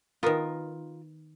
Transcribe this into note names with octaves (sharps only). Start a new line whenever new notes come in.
D#3 B3 F4 A#4